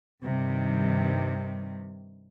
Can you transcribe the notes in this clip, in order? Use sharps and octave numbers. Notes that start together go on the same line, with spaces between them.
G2 C3 D#3 G3